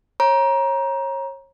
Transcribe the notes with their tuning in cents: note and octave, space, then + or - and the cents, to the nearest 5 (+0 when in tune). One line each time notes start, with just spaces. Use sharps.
C#5 -30 A#5 +25